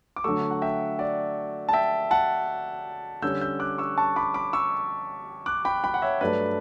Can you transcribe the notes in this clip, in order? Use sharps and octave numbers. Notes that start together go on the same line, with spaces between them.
D6
D3 F#3 A3 C#6 E6
F#5
E5 G5
D5 F#5
A5
E5 G5
F#5 A5
D3 G3 C#4 E6 G6
E6 G6
D6 F#6
C#6 E6
A5 C#6
B5 D6
B5 D6
C#6 E6
D6 F#6
G5 B5
G5 B5
F#5
C#5 E5
G2 F#3 A3 B4 D5